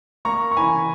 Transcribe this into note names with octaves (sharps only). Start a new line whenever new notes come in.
A#3 A#5 C#6
C#6
E3 G#5 B5